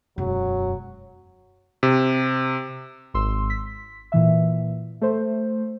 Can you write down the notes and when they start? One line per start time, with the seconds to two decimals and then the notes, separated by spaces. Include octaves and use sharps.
0.18 E1 F#2 F#3
1.83 C3
3.14 G#1 C6 E6
3.50 B6
4.12 A#2 E3 E5
5.01 A3 C5